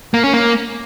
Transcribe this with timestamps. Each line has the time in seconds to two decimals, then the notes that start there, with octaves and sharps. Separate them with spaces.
0.14 A#3
0.24 C#4
0.34 A#3